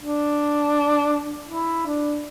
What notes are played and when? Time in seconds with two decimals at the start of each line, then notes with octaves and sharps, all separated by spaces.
0.01 D4
1.49 E4
1.86 D4